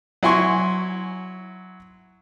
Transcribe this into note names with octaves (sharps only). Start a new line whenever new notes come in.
F#3 E4 G#5 C6 C#6